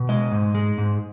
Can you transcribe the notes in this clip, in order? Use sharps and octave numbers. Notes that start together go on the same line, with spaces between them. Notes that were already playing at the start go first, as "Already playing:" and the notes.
Already playing: B2
G#3 D#5
G#2
G#3
G#2